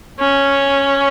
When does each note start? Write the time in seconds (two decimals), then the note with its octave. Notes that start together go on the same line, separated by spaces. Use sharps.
0.20 C#4